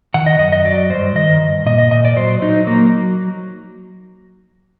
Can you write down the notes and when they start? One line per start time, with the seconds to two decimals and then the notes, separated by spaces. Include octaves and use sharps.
0.14 D#3 F#5
0.26 D#5
0.39 F#2 D#5
0.52 D#5
0.65 F#3 D5
0.90 G2 C5
1.16 D#3 D#5
1.41 G2
1.66 A#2 D#5
1.78 D#5
1.91 A#2 D#5
2.05 D5
2.17 F#3 C5
2.42 F#3 D#4
2.67 F#3 A#3